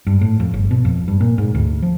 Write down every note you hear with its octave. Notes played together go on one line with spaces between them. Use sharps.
G2
A2
F2
G1
B2
F2
G2
A#2
G#2
D2
F3